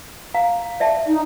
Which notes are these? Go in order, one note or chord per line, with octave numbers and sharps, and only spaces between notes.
F5 A#5
D5 E5 A5
D#4